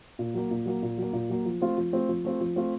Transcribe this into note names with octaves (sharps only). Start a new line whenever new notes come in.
A#2
F#3 A#3
A#2
F#3 A#3
A#2
F#3 A#3
A#2
F#3 A#3
F3
A3 C4 F4
F3
A3 C4 F4
F3
A3 C4 F4
F3
A3 C4 F4